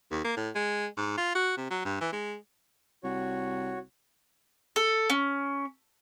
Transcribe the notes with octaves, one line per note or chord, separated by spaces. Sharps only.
D#2
A#3
A2
G#3
G#2
F4
F#4
C3
F#3
G2
E3
G#3
C2 F#4 C#5
A4
C#4